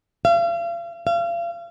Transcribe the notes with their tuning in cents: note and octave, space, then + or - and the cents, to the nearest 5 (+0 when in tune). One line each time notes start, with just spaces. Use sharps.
F5 -40
F5 -35